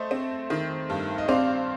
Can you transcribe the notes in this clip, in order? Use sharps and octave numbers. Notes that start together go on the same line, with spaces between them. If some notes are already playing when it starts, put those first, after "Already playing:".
Already playing: A3 C5 D#5
C4
D#3
G2
D#5
C4 D5 F5